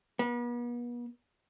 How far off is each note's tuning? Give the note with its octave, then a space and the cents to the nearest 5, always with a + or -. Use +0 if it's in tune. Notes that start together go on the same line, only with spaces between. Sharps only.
B3 -40